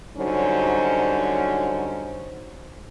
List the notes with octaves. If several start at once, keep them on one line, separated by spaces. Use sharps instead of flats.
D3 F#3 G3 C#4 D#4 C5